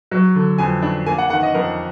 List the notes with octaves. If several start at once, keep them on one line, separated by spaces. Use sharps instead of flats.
F#3
D3
F2 G#5
D4
A#3 G#5
F#5
D#3 F#5
D#5
F2 A#4